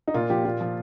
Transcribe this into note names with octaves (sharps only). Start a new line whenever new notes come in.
D#4
A#2 F4
F3 G4
A#2 F4
F3